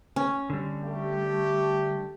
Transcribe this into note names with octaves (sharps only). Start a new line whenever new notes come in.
C#4
D3 G3
A3 G4